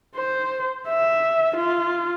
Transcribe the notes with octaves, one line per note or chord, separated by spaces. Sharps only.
C5
E5
F4